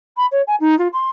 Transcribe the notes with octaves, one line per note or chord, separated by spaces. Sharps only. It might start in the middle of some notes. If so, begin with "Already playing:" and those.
B5
C#5
G#5
D#4
F4
C6